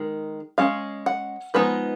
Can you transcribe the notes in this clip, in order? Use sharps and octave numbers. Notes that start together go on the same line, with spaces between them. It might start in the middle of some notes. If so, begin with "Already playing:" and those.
Already playing: D#3 G#3
G#3 C#4 F5
F#5
F3 G#3 B3 D#4 B4